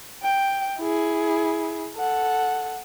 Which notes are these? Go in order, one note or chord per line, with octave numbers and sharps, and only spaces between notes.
G5
E4 G#4
A4 F#5